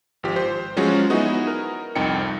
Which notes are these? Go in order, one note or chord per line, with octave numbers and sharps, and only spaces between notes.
G#1 F3 G4
C5
F3 F#3 G#3 C#4 F#4
B3 D#4 E4 F#4 G#4
A#4
C2 F2 D#4 G5 C#7